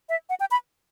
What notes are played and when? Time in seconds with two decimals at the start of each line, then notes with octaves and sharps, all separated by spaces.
0.09 E5
0.29 F#5
0.40 G5
0.51 B5